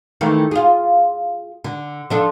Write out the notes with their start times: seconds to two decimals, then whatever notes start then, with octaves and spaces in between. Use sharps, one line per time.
0.21 D#3 E3 A3
0.51 F4 G#4
1.64 D3
2.10 F3 D4 A4